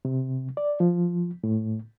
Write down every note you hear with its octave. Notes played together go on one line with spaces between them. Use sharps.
C3
D5
F3
A2